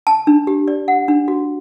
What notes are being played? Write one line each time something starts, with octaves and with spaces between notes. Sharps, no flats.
A5
D4
G4
D5
F#5
D4
F#4